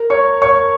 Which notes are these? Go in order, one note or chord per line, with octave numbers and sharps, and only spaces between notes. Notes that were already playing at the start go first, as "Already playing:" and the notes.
Already playing: A#4
C#5 C#6
C#5 C#6